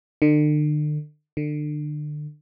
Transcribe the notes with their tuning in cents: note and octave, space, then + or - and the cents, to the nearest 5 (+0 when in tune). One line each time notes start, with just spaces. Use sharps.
D3 +40
D3 +30